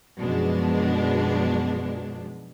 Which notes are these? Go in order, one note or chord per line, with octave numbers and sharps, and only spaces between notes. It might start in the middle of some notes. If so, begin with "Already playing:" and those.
F#2 B2 F3 G#3 D4